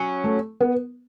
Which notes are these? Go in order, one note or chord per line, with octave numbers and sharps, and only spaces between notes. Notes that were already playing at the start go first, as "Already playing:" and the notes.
Already playing: F#3 C#4
A3
B3